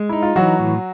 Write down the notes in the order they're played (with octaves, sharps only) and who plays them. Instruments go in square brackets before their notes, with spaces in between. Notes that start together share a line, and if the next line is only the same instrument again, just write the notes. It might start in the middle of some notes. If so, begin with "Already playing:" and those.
Already playing: [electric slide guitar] G#3
[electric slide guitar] D#4 [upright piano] E4
[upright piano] F4
[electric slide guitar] E3 [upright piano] F#3 F#4
[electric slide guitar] A2